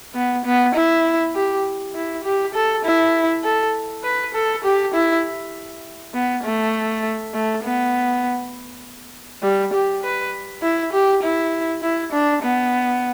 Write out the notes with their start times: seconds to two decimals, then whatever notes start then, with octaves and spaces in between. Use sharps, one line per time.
0.15 B3
0.45 B3
0.75 E4
1.35 G4
1.95 E4
2.24 G4
2.54 A4
2.84 E4
3.44 A4
4.03 B4
4.34 A4
4.64 G4
4.94 E4
6.14 B3
6.43 A3
7.34 A3
7.63 B3
9.43 G3
9.73 G4
10.03 B4
10.62 E4
10.93 G4
11.23 E4
11.82 E4
12.12 D4
12.42 B3